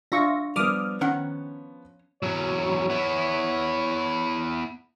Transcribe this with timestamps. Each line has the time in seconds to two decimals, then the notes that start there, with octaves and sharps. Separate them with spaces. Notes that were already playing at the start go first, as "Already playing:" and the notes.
0.12 D4 F4 E5 C#6 A#6
0.56 F3 G3 B3 D6 D#6 F6
1.01 D#3 C#4 F#5
2.23 E2 F#3 C#5
2.90 B3 E4